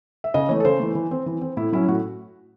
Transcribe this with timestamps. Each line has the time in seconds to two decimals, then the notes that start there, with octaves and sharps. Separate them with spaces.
0.24 E5
0.34 C#3 D#5
0.49 E3 A3 C#5
0.60 A4
0.65 C#3 C5
0.80 E3 A3
0.95 E3
1.11 C4
1.26 E3
1.41 C4
1.57 A2 E4
1.72 F#3 C#4 E4
1.88 A2 F#4